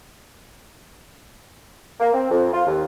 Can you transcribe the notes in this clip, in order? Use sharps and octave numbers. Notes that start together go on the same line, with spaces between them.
A#3
C4
F2
F4
D#2